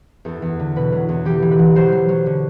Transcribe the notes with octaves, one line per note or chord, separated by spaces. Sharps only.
E2 A4
E2
D3
B2 B4
F#3
E2
E3 G4
E3
B4
E3
F#3 C5
F#3
F#3
D3